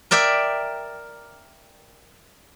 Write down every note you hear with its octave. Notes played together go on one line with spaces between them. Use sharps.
A#4 D5 E5 G5